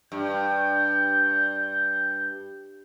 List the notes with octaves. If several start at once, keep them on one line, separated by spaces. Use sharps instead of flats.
G2 G6